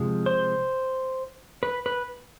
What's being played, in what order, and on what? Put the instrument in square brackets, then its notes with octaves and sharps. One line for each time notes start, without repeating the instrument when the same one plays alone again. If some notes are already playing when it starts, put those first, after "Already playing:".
Already playing: [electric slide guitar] C3 F3 G#3
C5
B4
B4